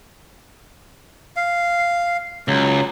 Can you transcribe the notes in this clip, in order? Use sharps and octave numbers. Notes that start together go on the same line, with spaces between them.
F5
C#2 F#3